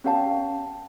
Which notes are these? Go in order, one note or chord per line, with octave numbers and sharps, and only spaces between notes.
C#4 G4 F5 A5